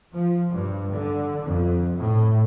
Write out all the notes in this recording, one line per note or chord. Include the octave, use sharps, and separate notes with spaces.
F3
G2
D3
F2
A2